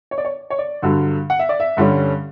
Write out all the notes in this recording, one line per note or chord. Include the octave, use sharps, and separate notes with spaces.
C#5
D5
C#5
C#5
D5
G2 D3 F#3
F#5
E5
D5
E5
G2 D3 G3 C#4